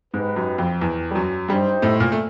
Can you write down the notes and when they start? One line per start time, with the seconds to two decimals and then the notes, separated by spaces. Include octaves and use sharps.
0.14 G#2 G#3 D#4 G4 B4
0.36 F#2 F#3
0.58 F2 F3
0.81 E2 E3
1.11 G3
1.15 F#2 F#3
1.49 G2 G3 D#4 G4 C5
1.82 A2 A3
2.00 A#2 A#3
2.12 A3